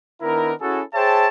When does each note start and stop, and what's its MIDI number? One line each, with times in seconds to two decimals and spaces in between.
0.21 0.52 51
0.21 0.52 59
0.21 0.52 62
0.21 0.52 64
0.21 0.52 70
0.60 0.81 61
0.60 0.81 64
0.60 0.81 66
0.60 0.81 68
0.60 0.81 69
0.94 1.28 68
0.94 1.28 72
0.94 1.28 73
0.94 1.28 76
0.94 1.28 79
0.94 1.28 81